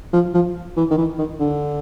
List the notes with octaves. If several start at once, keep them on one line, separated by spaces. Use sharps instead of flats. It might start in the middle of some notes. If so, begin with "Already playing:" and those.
F3
F3
E3
D#3
E3
D#3
D3